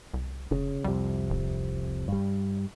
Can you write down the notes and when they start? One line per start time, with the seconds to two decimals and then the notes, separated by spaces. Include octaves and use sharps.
0.14 C2
0.51 F1 C#3
0.84 C2 F2 C3 G3
1.30 D1
2.08 G2 G3